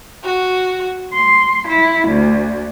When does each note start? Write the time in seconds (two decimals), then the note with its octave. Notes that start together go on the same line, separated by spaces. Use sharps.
0.23 F#4
1.11 C6
1.67 E4
2.08 D2